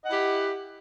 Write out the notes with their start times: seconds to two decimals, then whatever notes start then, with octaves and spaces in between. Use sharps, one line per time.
0.03 D#5
0.06 F#5
0.09 E4
0.12 G4